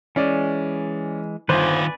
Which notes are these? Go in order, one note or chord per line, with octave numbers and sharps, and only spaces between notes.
E3 G#3 C#4 D5
G1 D#3 F4 B4 C5 D5 G#5